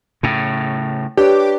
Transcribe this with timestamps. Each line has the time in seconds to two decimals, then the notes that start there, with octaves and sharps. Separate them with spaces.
0.23 A2 C#3
1.17 D4 G4 B4 C#5